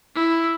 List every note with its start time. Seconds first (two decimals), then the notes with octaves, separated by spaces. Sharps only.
0.15 E4